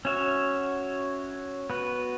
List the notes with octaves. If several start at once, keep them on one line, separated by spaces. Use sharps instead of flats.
C#4 F#4 C#5 E5
B3 F#4 B4